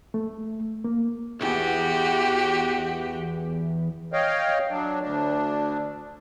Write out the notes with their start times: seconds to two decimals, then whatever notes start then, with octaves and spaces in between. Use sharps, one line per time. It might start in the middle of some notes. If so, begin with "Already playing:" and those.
0.14 A3
0.84 A#3
1.41 B1 E2 F#4 G4
4.13 C#5 D#5 F5 G5
4.70 F#3 D4
5.01 D2 D4